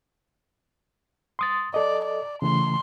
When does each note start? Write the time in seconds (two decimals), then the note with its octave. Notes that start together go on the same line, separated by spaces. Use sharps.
1.39 C6 D#6 A6
1.74 A4 D5 D#5
2.05 D5
2.42 C#3 E3 A3 C6